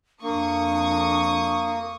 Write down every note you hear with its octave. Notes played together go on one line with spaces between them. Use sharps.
F2 A#3 D4 C#6 D#6